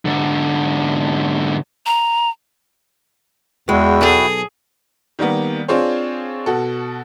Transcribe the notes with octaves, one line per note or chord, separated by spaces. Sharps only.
G#2 D3
A#5
E2 G#3 E4 F#4 G5
B1 G#4 A4
D#3 G3 A#3 B3
C4 D4 F4 G#4 C5 C#5
B2 F#4 A4